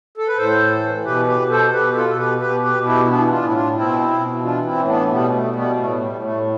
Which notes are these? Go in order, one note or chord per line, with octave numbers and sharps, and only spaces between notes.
A4
B4
A2 A4 C5
E3
B2 G4 B4
G4 B4
B2
A4 C5
B2 G4 B4
F4 A4
B2 A4
G4 B4
B2 G4 B4
G4 B4
B2
E4 G4
E4
E3 B3 D4
D4 F4
A2 E4
D4 F4
B2 C4 E4
B2
E3 D4 F4
C4 E4
A2
B3 D4
B2 G3 B3
A3
B2
G3 B3
A2 A3
G3
A2
A3